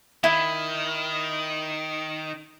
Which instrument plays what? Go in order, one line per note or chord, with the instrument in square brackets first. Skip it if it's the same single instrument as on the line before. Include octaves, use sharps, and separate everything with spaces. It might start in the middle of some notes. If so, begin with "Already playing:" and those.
[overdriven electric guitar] D#3 [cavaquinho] E4